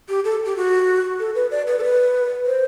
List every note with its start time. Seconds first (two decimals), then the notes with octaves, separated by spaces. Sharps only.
0.09 G4
0.25 A4
0.45 G4
0.56 F#4
1.20 A4
1.35 B4
1.51 D5
1.67 B4
1.79 A4
1.83 B4
2.46 C5